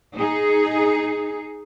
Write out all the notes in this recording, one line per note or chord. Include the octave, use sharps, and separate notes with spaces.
D#4 G#4